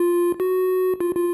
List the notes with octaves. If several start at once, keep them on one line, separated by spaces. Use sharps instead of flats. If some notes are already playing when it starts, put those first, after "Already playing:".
Already playing: F4
F#4
F4
F4